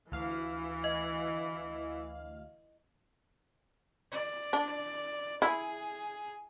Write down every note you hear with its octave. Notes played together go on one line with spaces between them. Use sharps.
D2 E3 F5
D#5
D5
D4
E4 G#4